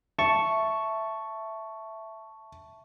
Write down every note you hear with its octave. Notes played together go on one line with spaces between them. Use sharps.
E5 A5 C#6